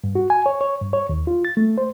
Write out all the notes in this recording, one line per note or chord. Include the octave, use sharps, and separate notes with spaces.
G2
F#4
G#5
C#5
C#5
G2
C#5
D#2
F4
A6
A3
C5